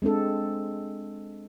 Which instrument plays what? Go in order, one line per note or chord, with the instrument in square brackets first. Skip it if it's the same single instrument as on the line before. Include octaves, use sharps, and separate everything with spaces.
[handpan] G#3 C4 D4 A4